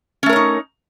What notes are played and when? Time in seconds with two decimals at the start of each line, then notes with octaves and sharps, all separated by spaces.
0.23 C#4
0.26 A3
0.29 A#4
0.33 C#5
0.36 D#4